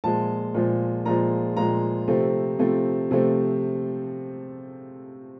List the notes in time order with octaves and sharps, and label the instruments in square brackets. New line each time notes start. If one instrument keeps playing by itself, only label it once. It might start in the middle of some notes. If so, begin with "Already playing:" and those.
[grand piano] A#2 F3 G#3 A5
A#2 F3 G#3
A#2 F3 G#3 A#5
A#2 F3 G#3 A#5
C3 F3 A3 C4
C3 F3 A3 C4
C3 F3 A3 C4